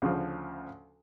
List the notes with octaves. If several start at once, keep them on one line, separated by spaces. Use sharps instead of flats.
D2 C#3 F3